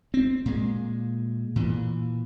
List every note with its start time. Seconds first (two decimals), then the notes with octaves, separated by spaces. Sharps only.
0.14 C4
0.46 A#2 G#3
1.56 A#2 E3